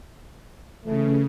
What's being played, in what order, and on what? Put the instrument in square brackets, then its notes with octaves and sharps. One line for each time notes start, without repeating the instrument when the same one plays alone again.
[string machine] C#3 [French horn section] E3 A3